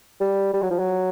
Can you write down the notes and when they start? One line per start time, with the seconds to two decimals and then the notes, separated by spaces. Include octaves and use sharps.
0.20 G3
0.54 G3
0.62 F#3
0.71 F3
0.79 F#3